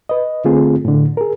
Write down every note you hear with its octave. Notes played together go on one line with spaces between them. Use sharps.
B4 D#5
D3 A3 C4 F4 G#4
A2 D3
G#4 A#4